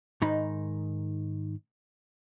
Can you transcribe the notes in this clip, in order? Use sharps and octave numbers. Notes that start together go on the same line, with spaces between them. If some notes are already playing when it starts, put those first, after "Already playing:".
G#2 D#3 D#4 B5